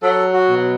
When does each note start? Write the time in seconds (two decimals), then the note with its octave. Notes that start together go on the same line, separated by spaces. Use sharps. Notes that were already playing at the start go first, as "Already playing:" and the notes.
0.02 F#3 A4
0.33 F#4
0.48 B2